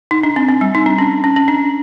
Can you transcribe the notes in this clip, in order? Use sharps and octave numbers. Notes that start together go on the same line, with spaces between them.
D#4
D4
C4
C4
G3
D#4
D4
C#4
C#4
C#4
D4